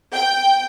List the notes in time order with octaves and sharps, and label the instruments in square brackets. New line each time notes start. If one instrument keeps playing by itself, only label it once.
[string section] G5